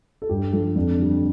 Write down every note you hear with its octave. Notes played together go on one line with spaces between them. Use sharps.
A4
G2 G4
F3 A4
F2 D4
D3 G3